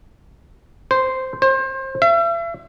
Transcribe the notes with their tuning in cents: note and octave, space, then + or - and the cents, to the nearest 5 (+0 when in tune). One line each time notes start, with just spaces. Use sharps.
C5 -5
C5 +30
E5 +40